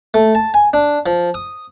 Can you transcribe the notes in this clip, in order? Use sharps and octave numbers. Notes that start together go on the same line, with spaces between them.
A3
A5
G#5
D4
F3
D#6